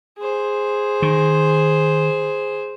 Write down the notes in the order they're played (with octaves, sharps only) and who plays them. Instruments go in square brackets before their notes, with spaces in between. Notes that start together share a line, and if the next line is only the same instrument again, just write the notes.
[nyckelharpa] G#4 C5
[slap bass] D#3